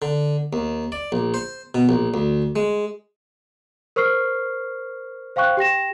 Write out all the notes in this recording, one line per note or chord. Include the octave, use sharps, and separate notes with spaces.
D3
D#2
D5
A#1
C5
B2
A#1
D2
G#3
A#4 C5 C#6 F6 C7
C5 F5 G5 C#6 F#6
G4 G5 A#6 E7